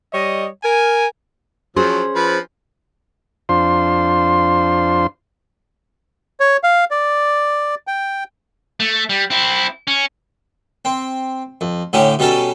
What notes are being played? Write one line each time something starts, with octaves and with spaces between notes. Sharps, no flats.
G3 C#5 D#5
A#4 G#5
F3 F#3 C#4 G#4 C5
F3 B4
F2 D4 F4 C5 C6
C#5
F5
D5
G5
A3
G3
C4 E4
C#4
C4
F2
A2 D3 C#4 G4
B2 G3 C#4 A4